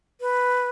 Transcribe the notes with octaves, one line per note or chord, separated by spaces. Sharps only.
B4